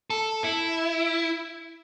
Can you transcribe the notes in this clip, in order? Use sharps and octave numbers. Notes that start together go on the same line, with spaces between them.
A4
E4